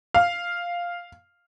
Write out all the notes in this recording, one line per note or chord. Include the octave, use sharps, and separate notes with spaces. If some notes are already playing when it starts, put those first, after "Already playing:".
F5